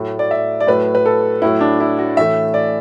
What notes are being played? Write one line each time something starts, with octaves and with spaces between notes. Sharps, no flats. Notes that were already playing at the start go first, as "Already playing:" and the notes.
Already playing: A2 F#3 A3
D5
E5
D5
A2 F#3 A3 B4
B4
A4
A2 F#3 A3 E4
D4
E4
F#4
A2 E3 A3 E5
D5